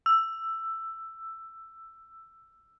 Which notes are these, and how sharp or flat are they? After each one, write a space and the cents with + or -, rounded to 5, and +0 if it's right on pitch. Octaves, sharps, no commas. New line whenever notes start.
E6 +10